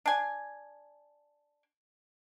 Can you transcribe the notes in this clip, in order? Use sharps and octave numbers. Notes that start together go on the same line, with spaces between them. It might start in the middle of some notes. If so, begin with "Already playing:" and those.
D4 G#5